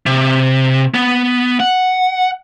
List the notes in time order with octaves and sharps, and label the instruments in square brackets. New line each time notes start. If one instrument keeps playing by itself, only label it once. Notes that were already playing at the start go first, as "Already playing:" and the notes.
[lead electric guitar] C3
B3
F#5